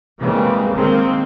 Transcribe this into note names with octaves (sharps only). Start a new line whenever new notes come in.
C#3 E3 G3 G#3 A#3 C4
D#3 G#3 A#3 C4